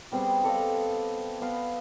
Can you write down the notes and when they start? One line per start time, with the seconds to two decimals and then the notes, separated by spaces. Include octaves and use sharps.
0.12 G3 B3 C4 G#4
0.44 A4 D5 D#5 F5
1.41 B3 F5